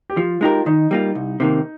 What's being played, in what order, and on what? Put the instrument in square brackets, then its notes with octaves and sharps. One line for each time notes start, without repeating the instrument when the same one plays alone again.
[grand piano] G4
[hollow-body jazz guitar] F3 [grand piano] F4
[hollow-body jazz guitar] G#3 D#4 G4 A#4 [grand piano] F4
[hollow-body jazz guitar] D#3 [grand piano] D#4
[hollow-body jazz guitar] G3 A#3 F4
C2
C3 D#3 A#3